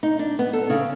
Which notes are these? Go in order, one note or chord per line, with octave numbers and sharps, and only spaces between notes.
D#4
D4
B3
A4
C#3